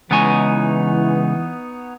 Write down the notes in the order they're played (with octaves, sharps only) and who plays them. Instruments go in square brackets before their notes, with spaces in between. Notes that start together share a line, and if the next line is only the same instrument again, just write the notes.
[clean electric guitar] C#3 G#3 G#5 [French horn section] E3 [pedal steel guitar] B3 D#4 C#5